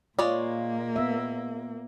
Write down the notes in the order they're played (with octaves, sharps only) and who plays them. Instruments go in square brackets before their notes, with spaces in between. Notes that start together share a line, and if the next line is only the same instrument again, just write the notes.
[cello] A#2 A#3 [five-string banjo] G#3 C#5 D5 [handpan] F4
[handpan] B3 E5